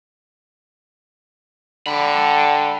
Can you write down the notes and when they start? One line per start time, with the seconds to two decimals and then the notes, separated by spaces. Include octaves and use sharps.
1.87 D3 G5 B5